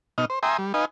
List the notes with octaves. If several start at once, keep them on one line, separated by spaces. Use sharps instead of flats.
B2 D#4 D#5 F6
C5
E5 G5 G#5 A#5 C6 D#6
G3
D#4 B4 D#5 F5 G#5